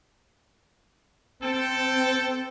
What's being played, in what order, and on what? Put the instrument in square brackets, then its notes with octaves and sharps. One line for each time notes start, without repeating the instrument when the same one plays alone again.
[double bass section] C4 [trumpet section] A4 G5